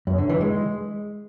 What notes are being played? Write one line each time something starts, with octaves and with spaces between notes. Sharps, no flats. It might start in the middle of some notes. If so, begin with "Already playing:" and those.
F#2
D3
E3
G#3